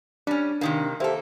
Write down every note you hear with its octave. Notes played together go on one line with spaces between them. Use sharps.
G3 C#4 D4
C3 D#3 A#3
A#3 G4 A4 C5 E5